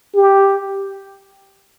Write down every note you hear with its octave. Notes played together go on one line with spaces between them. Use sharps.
G4